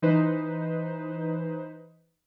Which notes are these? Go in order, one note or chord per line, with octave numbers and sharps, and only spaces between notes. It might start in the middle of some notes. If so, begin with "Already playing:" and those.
E3 D#4 B4 C5